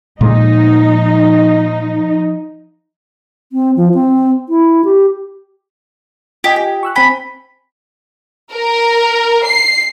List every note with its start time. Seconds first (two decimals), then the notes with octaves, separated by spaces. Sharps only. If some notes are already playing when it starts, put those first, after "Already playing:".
0.21 A#2 F3 G#3 D#4
3.52 C4
3.77 F3
3.94 C4
4.49 E4
4.84 G4
6.44 F4 G4 D#5 G#5
6.56 G4
6.83 C#6 E6 F#6
6.96 C4 G5 G#5 B5
8.54 A#4
9.46 C7